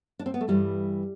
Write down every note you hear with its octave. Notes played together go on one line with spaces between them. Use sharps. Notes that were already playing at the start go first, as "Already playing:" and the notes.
D4
C4
B3
A3
G2 E3 G3